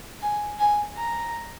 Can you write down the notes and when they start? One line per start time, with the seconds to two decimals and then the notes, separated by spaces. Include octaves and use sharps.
0.22 G#5
0.59 G#5
0.97 A#5